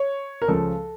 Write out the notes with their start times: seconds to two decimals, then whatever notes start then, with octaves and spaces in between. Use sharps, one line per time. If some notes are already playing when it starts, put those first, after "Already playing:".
Already playing: C#5
0.42 A#4
0.48 C#2 C#3 F3 A4